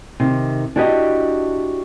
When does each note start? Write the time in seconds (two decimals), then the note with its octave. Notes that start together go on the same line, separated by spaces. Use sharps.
0.20 C3 D#3
0.76 D4 E4 F#4 G4 B4 D#5